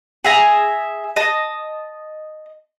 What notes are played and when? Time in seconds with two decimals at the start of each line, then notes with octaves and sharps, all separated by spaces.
0.24 G#4 E5 G#5 A#5
1.16 D#5 A5